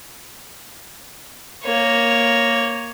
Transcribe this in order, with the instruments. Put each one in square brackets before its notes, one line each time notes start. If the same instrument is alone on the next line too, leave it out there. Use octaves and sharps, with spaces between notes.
[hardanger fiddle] A#3 C#5